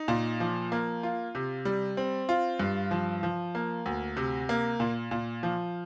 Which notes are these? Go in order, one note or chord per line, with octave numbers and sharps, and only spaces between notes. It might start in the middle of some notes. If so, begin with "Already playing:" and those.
Already playing: D#4
A#2
F3
A#3
F4
C3
G3
C4
F4
G2
F3
F3
A#3
D2
C3
A#3
A#2
A#2
F3